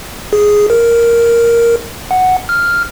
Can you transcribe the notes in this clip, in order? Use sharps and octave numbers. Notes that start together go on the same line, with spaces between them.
G#4
A#4
F#5
F6